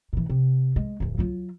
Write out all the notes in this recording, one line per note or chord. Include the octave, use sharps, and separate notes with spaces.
A#2 E3
C3
G#3
D1 E2
F#3 F4